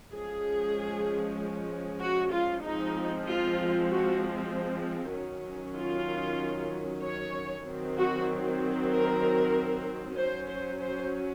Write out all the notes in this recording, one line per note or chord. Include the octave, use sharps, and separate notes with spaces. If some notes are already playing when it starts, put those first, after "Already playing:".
F3 G#3 C#4 G#4
F#4
F4
F3 G#3 C4 D#4
F4
F#4
D#3 F#3 C#4
F4
C#5
D#3 F#3 C4
F#4
A#4
F#3 C#4 C5
C5
C5